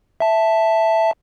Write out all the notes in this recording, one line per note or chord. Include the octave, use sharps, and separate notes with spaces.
E5 A5